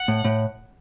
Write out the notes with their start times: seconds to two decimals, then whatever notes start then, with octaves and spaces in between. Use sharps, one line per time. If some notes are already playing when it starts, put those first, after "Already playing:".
Already playing: F#5
0.08 A2
0.25 A2